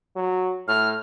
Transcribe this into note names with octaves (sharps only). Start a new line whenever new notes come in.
F#3
A2 F6